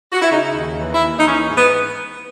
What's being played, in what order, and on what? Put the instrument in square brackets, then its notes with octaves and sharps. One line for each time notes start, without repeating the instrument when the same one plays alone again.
[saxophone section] F#4
E4
C#3 D#4
D#2
E3
E4
D#2
D#4
E3 C#4
G#2
B3